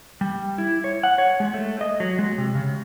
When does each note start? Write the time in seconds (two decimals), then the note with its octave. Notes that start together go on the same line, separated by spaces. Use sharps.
0.21 G3
0.58 E4
0.84 C#5
1.03 F#5
1.18 C#5
1.40 G#3
1.54 A3
1.81 D#5
2.00 F#3
2.19 G#3
2.38 C3
2.55 C#3